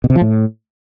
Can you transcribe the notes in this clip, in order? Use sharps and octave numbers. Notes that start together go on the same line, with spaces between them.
B2
C3
F3
A2